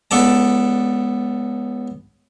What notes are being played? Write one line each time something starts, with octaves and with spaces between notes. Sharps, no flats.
C#2 B3 A4 D5 A5